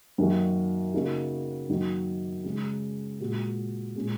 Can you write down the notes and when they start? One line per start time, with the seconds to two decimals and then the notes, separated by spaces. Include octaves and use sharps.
0.18 F#2 D#3 A#3 F#4
0.93 C#3 A#3 D#4 F#4
1.69 F#2 D#3 A#3 D#4 F#4
2.44 C#3 G#3 C#4
3.20 A#2 G#3 F#4
3.95 A#2 G#3 C#4